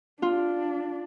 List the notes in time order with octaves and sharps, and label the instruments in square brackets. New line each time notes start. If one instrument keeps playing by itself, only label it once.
[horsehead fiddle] D4 [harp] F4